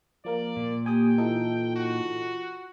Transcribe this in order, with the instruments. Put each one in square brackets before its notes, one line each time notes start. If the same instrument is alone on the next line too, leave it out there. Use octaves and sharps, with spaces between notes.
[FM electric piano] F3 A#3 A#4 [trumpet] D5
[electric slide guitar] A#2
[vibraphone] A#3 G4 [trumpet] G5 [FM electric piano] G#5 D#6
[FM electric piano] E3 D#4 A4 [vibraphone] F4
[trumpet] F#4